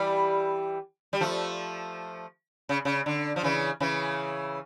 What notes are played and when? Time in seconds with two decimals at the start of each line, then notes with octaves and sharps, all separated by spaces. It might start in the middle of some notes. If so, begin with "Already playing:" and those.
Already playing: E3 G3
1.13 G3
1.21 F3 A3
2.69 C#3
2.85 C#3
3.06 D3
3.36 F3
3.43 C#3 E3
3.80 C#3 E3